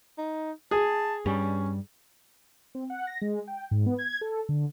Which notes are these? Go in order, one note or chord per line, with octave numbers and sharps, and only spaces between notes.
D#4
G#4 A5
G2 G3 C#4
C4
F#5
A#6
G#3
G5
G#2
B3
G#6
A4
D3